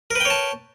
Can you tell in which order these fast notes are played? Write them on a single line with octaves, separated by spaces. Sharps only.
A#4 B4 G5 C#5 A5